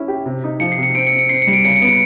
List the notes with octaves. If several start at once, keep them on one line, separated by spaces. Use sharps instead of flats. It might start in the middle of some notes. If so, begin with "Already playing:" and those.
Already playing: C#4 E4
G4
C3
D#4
F3 C#7
C7
C3
C#7
C4 D7
C#7
C4
C#7
C4 C7
C#7
G3
D7
C#3 C#7
C#7
B3 D7
C#7